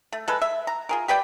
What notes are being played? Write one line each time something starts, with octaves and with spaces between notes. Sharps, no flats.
A3
G#3 A4 B4
E5
A#5
F4 G#4 A#4
G4 B4 D5 G5